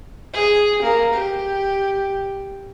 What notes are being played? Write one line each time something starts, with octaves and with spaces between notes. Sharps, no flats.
G#4
A#3
G4